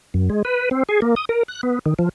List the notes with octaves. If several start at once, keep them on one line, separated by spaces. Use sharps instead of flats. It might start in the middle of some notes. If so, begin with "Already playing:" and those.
F#2
G#3
B4
C4
G#4
A#3
D#6
A#4
F#6
B3
D#3
F3